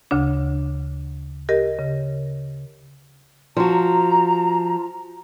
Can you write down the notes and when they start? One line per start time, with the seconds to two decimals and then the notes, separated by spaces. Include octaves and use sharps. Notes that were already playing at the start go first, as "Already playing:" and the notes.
0.11 D2 C#3 D4
1.49 G4 A#4 D#5
1.79 C#3
3.57 F3 F#4 A#5